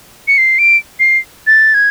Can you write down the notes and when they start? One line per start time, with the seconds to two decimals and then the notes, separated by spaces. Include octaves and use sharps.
0.28 C#7
0.38 C7
0.59 D7
0.99 C7
1.47 A6
1.74 G#6